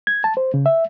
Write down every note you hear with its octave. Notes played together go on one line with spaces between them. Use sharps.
G#6
A5
C5
C#3
E5